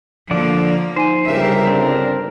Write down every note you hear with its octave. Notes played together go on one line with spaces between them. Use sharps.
D3 F3 A#3 D5
D#4 C5 G#5 D#7
G1 C#2 G3 G4 A#4 E5
C4 D4